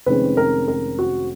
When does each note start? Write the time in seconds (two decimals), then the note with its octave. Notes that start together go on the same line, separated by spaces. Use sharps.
0.06 F1 F2 D#3 G#3 C#4 B4
0.37 A#4
0.68 A#4
0.99 F#4